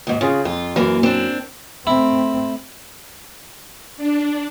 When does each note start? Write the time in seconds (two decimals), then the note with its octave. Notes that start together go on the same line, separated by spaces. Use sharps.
0.07 D#2 G#2
0.21 C#3 C#4 F4 G#4
0.45 F2 F4
0.76 F#2 E3 A#3
1.03 C4 D4
1.87 A3 C4 E4
3.97 D4